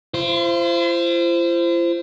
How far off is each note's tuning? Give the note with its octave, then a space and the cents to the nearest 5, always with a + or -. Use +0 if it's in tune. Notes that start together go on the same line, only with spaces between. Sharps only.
F4 -45 C5 +0